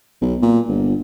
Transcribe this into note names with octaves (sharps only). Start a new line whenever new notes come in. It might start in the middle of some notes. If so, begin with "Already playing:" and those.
B1
A#2
G1